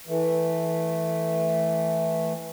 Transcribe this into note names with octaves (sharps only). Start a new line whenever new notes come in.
E3 A3